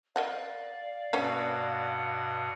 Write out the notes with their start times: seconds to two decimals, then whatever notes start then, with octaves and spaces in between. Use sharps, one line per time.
0.16 A#4 D5 D#5 F5 F#5
1.13 G2 B2 A#3 B3 C#4 F#5